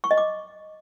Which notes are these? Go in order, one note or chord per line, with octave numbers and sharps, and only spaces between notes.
C#6
D#5
D6